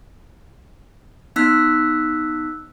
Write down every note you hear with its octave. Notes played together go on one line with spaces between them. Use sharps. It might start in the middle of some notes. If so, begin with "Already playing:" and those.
B3 D#4 E6 F#6 B6